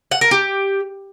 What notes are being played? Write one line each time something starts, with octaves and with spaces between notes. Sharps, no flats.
F#5
A#4
G4